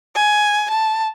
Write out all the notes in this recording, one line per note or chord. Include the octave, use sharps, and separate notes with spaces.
G#5
A5